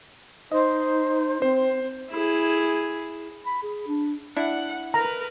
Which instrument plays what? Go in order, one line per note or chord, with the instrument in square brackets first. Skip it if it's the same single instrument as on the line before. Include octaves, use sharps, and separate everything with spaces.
[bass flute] D#4 [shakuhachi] C5 [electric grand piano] D#5
[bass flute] C4 [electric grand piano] C5
[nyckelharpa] E4 G#4
[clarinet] B5
G#4
D4
[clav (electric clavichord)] D4 E4 [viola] F#5
[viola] A#4 B4 [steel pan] A#5